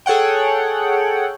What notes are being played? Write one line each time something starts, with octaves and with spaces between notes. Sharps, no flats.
G#4 A4 C#5 F#5 G5